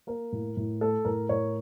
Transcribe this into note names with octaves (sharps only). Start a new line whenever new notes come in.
A#3 A#4
A2
A2
A3 A4
A2 A#4
A2 A#4 C#5